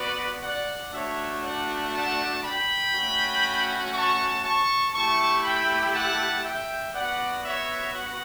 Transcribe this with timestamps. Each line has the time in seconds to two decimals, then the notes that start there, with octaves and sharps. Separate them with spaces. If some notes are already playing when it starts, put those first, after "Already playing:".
Already playing: B3 F#4 B4 D5
0.43 D5 F#5
0.93 A3 D4 F#4 C#5 E5
1.43 D5 F#5
1.94 F#5 A5
2.43 G5 B5
2.94 A3 C#4 F#4
3.94 A5 C#6
4.44 A5 C#6
4.94 A3 E4 G4 A5 C#6
5.44 G5 B5
5.94 F#5 A5
6.44 E5 G5
6.94 B3 F#4 D5 F#5
7.45 C#5 E5
7.94 F#5